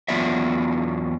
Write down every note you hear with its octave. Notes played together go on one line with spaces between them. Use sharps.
E2 F#3 B3 F4 D5 E5